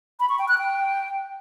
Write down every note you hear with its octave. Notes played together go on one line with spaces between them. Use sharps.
B5
C#6
G5
F#6
G5